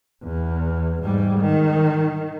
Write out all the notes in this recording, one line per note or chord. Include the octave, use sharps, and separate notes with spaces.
E2
G#2 G3
D#3